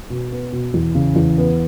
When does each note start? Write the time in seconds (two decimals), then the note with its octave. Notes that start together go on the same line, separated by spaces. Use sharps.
0.10 B2
0.32 B3
0.53 B2
0.74 E2
0.95 C#3
1.16 E2
1.38 B3